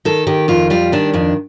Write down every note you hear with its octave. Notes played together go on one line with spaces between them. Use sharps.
D#3 A4
D#3 G4
F2 F4
G3 F4
D#3 D4
F2 D4